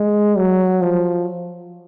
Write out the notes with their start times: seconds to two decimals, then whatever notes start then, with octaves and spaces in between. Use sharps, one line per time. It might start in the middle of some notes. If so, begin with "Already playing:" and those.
Already playing: G#3
0.37 F#3
0.81 F3